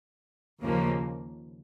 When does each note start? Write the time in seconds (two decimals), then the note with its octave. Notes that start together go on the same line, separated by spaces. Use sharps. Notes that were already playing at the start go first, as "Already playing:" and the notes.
0.63 D#2 C#3 F3 A#3